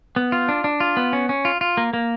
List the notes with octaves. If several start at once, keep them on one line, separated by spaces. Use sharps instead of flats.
B3
F4
D4
D4
F4
B3
C#4
C#4
F4
F4
A#3
A#3